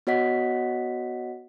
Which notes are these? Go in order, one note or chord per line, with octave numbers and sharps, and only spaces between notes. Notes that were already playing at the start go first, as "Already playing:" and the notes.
B3 F#4 C#5 D#5 F#5 B6